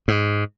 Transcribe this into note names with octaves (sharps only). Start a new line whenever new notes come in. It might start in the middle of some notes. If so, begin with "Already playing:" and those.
G#2